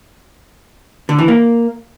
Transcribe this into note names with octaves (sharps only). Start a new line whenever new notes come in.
D3
E3
A#3